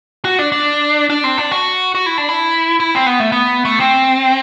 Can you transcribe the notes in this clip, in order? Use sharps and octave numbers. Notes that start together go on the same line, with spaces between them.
F#4
D4
D4
D4
C4
D4
F#4
F#4
E4
D4
E4
E4
C4
B3
A3
B3
A3
C4